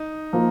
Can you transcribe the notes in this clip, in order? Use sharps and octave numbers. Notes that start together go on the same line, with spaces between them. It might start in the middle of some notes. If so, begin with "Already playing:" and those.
Already playing: D#4
F3 A#3 F4